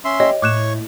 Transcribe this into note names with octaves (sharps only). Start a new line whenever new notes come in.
C#4 E5 C6
G4 C#5 D#5
A2 C#5 C#6 D6 F#6 E7